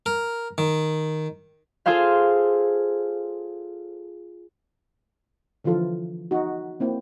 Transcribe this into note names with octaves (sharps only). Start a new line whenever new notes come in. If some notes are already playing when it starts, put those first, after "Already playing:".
A#4
D#3
F4 G#4 A4 C5 F5
D3 E3 F3 F4 A4
D#4 F#4
A#3 C4 E4